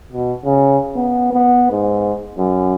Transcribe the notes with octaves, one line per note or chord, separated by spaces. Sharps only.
B2
C#3
B3
B3
G#2
F#2